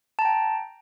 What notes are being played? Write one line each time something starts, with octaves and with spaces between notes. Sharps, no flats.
G5 A5 A#5